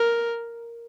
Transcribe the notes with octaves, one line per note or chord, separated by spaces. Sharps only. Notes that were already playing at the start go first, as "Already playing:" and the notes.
Already playing: A#4